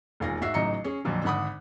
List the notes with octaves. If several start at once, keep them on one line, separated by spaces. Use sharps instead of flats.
E1 D#2 F4 F5 G#5 A#6
G#2 F#4 E5 F5 C7
A1 C#3 F#3 D#4 A#5 C#7
C#4 G#4
F2 A#2 D3 F3 F#3
G#1 D3 F#5 B5 D6 D#6